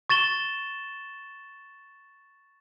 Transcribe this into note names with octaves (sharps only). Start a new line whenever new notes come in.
C#6 A6 E7 G7